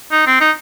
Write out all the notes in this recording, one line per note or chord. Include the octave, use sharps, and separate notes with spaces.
D#4
C4
D#4